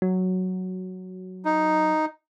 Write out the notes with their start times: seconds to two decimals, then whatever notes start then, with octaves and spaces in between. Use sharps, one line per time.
0.02 F#3
1.45 D#4